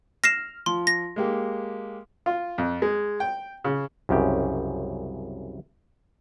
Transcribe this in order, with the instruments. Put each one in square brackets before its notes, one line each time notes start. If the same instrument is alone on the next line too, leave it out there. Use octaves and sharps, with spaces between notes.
[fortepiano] F6 [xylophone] A#6 C7 E7
[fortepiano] F3 [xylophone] C6
[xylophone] A#6
[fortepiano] G#3 A#3 G4
F4
F2
G#3
G5
C#3
[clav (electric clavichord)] C2 F#2 C#3 G4